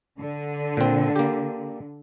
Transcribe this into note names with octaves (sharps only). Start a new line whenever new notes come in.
D3
A#2 C4
A#3 G4